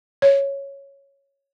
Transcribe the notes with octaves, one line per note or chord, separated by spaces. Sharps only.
C#5